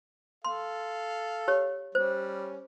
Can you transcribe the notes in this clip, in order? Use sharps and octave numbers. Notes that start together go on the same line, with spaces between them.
A4 F5 C6
G4 C#5
G3 C#4 C5